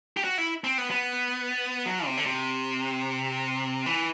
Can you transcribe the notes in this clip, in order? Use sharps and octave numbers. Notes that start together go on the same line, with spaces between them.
G4
F#4
E4
C4
B3
B3
F#3
C3
D3
C3
E3